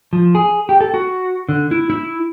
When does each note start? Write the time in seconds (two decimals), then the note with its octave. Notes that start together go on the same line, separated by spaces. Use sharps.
0.13 F3
0.35 G#4
0.69 G4
0.81 A4
0.94 F#4
1.49 D3
1.71 E4
1.90 E4